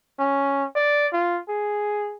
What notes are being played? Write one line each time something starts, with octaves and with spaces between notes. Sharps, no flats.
C#4
D5
F4
G#4